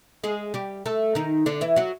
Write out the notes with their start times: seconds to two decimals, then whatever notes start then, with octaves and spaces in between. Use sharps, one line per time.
0.24 G#3 G#4
0.54 G3 G4
0.86 A3 A4
1.15 D#3 D#4
1.46 D3 D4
1.61 E3 E4
1.76 F#3 F#4